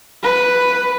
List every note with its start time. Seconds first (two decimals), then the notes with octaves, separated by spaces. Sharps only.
0.23 B4